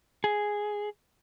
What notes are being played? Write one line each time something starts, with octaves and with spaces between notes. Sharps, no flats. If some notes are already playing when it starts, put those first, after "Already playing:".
G#4